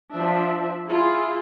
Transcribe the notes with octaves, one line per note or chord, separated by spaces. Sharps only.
F3 D4 E5
E4 F4 G#4